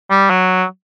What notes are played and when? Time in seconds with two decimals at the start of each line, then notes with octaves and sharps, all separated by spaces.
0.10 G3
0.30 F#3